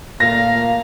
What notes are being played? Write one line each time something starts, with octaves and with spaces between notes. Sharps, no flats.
A#2 A3 A#3 F5 A#6